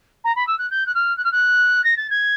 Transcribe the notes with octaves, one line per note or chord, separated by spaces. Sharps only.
A#5
B5
E6
F#6
G6
F#6
F6
F#6
F6
F#6
A#6
A6
G#6